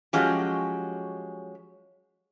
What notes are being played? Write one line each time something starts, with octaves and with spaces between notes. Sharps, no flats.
F3 F#3 G#3 C#4 G4